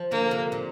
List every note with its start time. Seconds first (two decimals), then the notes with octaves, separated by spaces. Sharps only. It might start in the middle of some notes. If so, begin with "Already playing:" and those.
Already playing: F3
0.11 D3 A#3
0.31 C3
0.52 A#2